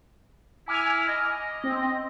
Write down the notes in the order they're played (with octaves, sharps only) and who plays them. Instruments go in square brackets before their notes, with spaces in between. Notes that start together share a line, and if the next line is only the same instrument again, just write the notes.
[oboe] E4 [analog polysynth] G#5 D6 F6
[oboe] D#5
[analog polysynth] C4